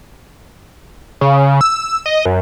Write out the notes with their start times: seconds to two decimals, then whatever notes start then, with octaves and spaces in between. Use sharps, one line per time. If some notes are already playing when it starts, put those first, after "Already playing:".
1.21 C#3
1.61 E6
2.06 D#5
2.25 F#2